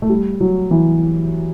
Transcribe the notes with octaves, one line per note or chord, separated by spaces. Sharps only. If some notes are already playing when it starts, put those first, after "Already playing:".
A3
G3
F#3
E3